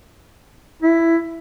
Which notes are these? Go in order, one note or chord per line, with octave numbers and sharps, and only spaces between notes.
E4